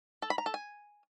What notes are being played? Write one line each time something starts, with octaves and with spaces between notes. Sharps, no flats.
A4
B5
A#5
A4
G#5